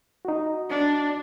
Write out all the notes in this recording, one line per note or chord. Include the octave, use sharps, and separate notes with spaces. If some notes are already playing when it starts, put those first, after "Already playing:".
D#4 F#4
D4